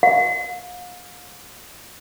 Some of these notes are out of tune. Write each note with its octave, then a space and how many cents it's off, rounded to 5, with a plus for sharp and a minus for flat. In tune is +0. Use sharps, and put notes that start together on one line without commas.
F5 +40